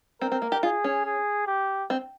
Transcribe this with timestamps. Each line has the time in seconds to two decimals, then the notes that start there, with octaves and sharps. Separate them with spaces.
0.21 C4 A#4
0.32 C4
0.42 A#3
0.52 G4
0.63 F4 G#4
0.84 C#4
1.05 G#4
1.47 G4
1.90 C4